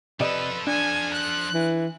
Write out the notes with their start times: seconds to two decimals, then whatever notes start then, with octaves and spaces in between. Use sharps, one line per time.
0.20 C3 F3 A4 B4 D5 D#5
0.67 D4 G#5
1.13 F#6
1.54 E3